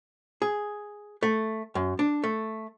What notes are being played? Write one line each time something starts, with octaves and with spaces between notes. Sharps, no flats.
G#4
A3
F#2
D4
A3